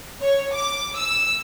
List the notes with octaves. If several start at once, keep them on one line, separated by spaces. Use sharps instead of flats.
C#5
D6
E6